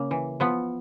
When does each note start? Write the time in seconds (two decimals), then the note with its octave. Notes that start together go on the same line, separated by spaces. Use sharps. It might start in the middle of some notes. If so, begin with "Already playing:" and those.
Already playing: C#3 A#3
0.11 E3
0.40 F3 B3